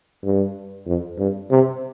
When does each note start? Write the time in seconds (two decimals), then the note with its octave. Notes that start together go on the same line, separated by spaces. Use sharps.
0.23 G2
0.87 F2
1.18 G2
1.51 C3